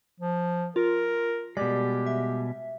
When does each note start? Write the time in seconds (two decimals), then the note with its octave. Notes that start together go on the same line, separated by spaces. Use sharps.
0.20 F3
0.76 F4 A#4
1.57 B2 G3 G#3 G4 D5
2.07 E5